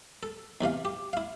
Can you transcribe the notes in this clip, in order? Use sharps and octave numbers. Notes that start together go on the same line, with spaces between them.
A4
B1 C3 E3 F5
G4
E4 F5